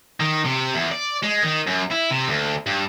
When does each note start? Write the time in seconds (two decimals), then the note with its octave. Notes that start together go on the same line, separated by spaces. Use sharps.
0.20 D#3
0.45 C3
0.75 E2
0.92 D5
1.23 G#3
1.43 D#3
1.67 F#2
1.92 E4
2.11 C3
2.28 D2
2.66 G2